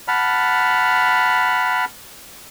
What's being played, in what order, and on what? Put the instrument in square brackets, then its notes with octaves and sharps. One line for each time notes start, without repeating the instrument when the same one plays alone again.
[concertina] F#5 A5 B5 F6